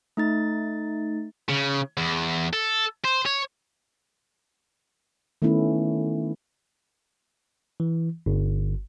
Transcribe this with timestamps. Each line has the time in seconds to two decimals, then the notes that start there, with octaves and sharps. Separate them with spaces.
0.17 A3 D#4 A6
1.49 C#3
1.97 E2
2.53 A4
3.05 C5
3.26 C#5
5.42 D#3 A3 B3 C#4 E4
7.80 E3
8.26 G1